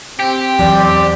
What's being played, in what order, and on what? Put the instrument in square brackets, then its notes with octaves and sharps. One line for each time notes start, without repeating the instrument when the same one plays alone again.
[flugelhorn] C4 [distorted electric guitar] G4
[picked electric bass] E2 F#3 [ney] D5